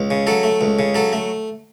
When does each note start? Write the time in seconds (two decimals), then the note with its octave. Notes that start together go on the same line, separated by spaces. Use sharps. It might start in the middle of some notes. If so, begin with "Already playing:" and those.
Already playing: C#2
0.11 C#3
0.27 F#3 A4
0.43 A3
0.61 C#2
0.79 C#3
0.95 F#3 A4
1.13 A3